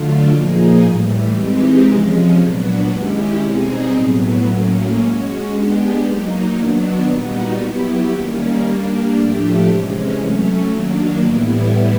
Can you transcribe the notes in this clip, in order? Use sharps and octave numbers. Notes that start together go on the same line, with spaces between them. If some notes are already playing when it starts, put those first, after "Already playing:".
Already playing: D3 F#3 A3 D4 F4
A#2 F3 A#3 D#4 G#4
A2 E3 G3
E3 G#3 C4 D#4 G4
C3 F3 G#3 C#4
A#2 F#3 B3 D4 F#4
D#3 G#3 C#4 E4 G4
B2 G3 C4 D#4 G#4
A2 F#3 B3
A2 F#3 A#3 C#4
G#3 C#4 F#4
G#3 B3 D4 G4
F#3 A#3 D#4
D#3 F#3 B3 D4
A#2 G3 B3 D#4 F#4
F#3 B3 E4 G4
D#3 G3 A#3 C#4
G3 A#3 D4
A2 F3 A3 D4 G4
C3 E3 G#3 C#4
F#3 A3 C#4
D#3 F#3 A#3 D4
A2 E3 G3 B3 E4